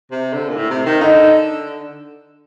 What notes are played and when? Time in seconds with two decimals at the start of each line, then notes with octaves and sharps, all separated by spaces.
0.11 C3
0.34 D3
0.49 A#2
0.56 A2
0.70 C3
0.85 D#3
1.01 D3 D#4